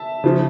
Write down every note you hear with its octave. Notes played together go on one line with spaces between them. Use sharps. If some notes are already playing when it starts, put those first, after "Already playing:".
Already playing: E5 A5
C#3 F3